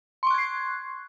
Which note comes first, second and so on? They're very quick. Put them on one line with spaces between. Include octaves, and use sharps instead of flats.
C6 C#6 F#6 G#6 C7